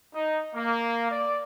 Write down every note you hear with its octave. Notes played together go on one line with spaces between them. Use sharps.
D#4
A#3
D5